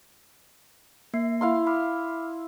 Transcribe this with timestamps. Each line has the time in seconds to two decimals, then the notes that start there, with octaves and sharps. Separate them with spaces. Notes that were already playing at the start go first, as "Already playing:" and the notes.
1.14 A#3 E5 C7
1.41 E4 F5 C6
1.67 B5 D6 F6